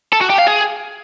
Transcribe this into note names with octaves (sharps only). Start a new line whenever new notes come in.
A4
F#4
G4
F5
G#4